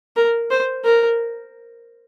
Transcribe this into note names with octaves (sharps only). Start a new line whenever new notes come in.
A#4
C5
A#4